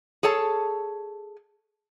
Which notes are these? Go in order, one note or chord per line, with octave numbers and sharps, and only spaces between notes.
G#4 A4 C#5 A5